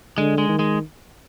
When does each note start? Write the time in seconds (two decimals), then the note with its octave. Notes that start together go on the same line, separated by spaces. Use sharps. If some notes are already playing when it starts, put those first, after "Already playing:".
0.18 D3 G#3
0.38 G#3
0.49 D#3
0.59 G#3